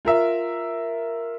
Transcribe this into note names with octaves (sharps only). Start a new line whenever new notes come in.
F4 A#4 E5